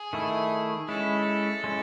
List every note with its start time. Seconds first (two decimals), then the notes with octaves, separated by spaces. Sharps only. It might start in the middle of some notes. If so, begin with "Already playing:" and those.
Already playing: G#4
0.13 D#3 A3 E4
0.88 G#3 C#4 E4 A4
1.64 G#3 C#4 E4